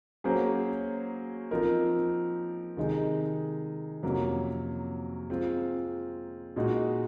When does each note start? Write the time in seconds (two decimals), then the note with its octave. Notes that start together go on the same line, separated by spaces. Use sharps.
0.24 F#3 A#3 C#4 G#4 C5
1.51 F3 C4 D#4 A#4
2.77 C3 D#3 G#3 D#4 G#4
4.03 F2 C3 F#3 A#3 C#4
5.30 G#3 C4 F4
6.56 A#2 G#3 D#4 F#4